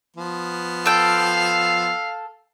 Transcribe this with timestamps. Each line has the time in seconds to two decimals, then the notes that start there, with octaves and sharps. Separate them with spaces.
0.16 F3 B3
0.86 A4 F5 G5